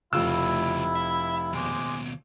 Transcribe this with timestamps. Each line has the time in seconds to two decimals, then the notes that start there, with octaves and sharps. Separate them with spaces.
0.13 F1 C#3 A3 E4 F4 E6
0.95 E5
1.53 D#2 B2 G#3 C5 D6